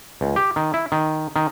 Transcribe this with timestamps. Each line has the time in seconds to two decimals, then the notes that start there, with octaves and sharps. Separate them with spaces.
0.21 C#2
0.36 G4
0.56 D#3
0.74 E4
0.92 D#3
1.36 D#3